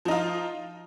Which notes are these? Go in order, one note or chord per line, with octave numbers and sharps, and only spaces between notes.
F3 D#4 F4